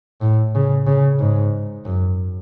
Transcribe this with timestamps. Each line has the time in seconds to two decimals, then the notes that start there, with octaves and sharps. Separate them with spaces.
0.21 A2
0.55 C#3
0.87 C#3
1.20 G#2
1.85 F#2